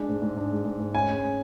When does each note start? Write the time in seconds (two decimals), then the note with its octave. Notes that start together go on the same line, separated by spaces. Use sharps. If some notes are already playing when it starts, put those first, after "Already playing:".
Already playing: G#3 D4
0.09 G#2
0.22 G#2
0.37 D4
0.51 G#3
0.65 G#2
0.80 G#2
0.94 C#4 G#5
1.09 G#3